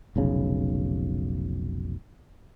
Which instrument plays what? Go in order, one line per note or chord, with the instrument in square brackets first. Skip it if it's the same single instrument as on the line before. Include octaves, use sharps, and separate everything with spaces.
[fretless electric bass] F1 B1 C#3